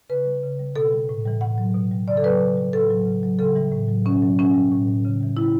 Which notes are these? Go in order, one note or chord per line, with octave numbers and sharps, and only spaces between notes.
C#3 B4
G3
C#3
G3
B2 A4
G3
A2
E3 G3
A2 F#5
F#3
B2
G3
C#3 D5
A4
F#3 B4
C#3
G3
A2 A4
F#3
C#3
F#3
C#3 A4
E3 G3
A2
F#3
B2 C#4
F#3
B2 C#4
G3
A2
G3
C#3
E3 G3
C#3 E4